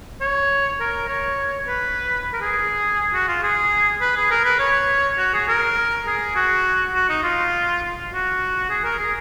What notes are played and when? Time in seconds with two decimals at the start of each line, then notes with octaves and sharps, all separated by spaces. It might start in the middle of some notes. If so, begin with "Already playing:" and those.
0.21 C#5
0.80 A#4
1.08 C#5
1.67 B4
2.33 A#4
2.41 G#4
3.14 F#4
3.28 F4
3.43 G#4
4.01 B4
4.16 G#4
4.31 A#4
4.45 B4
4.60 C#5
5.18 F#4
5.34 G#4
5.49 A#4
6.07 G#4
6.36 F#4
6.95 F#4
7.10 D#4
7.24 F4
8.12 F#4
8.70 G#4
8.84 A#4
8.99 G#4